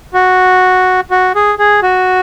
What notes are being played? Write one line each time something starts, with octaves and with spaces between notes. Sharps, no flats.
F#4
F#4
G#4
G#4
F#4